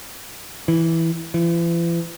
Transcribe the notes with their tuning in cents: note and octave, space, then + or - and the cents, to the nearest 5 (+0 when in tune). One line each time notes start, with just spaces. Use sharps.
E3 -5
E3 +45